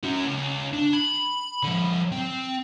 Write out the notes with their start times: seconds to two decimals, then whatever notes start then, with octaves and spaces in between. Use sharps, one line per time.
0.03 C#4 F#4
0.25 C#2
0.73 D4
0.93 B5
1.63 D3 F3
2.12 C4